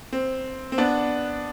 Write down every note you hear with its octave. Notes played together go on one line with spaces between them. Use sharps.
C4
C4
B3 D4